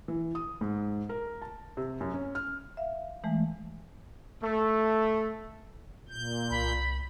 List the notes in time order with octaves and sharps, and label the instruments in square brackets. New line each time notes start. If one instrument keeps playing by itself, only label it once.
[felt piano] E3
D#6
G#2
A#4
A5
C3
F#2
C#4
F6
[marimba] E5 F5
E3 G#3 A3
[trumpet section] A3
[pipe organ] A#2 G6
[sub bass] C2 [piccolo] B5